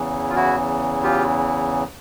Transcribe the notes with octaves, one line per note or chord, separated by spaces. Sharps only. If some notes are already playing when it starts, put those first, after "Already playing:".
Already playing: E2 C#3 E3
F4
E4 F#4
F4 G4